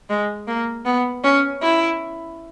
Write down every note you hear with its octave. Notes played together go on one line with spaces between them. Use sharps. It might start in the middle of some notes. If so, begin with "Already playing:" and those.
G#3
A#3
B3
C#4
E4